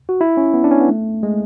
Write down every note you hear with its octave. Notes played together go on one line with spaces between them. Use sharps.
F#4
E4
C#4
B3
D4
C#4
B3
A3
G#3